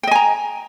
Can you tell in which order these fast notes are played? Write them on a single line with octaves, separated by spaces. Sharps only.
G5 D#5 G#5 A#5